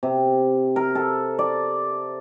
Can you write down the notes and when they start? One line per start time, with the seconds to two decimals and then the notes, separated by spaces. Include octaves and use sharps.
0.03 C3
0.76 A#4
0.95 A4
1.39 D5